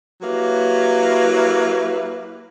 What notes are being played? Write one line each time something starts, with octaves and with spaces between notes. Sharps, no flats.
F#3 A#3 E4 G4 B4